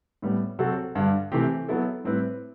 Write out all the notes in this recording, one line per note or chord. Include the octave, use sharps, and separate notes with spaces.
A2 G3 B3
C3 F#3 C4 F#4 A4
G2 D3 G3
C3 E3 A3 C4 G4
F#3 B3 E4 A4
A2 G3 C4 E4 B4